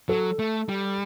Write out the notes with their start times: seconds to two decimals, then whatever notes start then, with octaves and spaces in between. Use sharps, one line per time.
0.09 F#3 A4
0.39 A3
0.69 G3